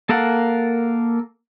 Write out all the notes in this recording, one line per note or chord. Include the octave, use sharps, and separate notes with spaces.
A#3 A4 A#4 F5 F#5